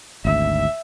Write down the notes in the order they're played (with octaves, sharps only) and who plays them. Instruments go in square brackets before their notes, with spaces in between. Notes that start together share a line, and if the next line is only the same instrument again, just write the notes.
[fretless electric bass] G#1 D2 [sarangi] E5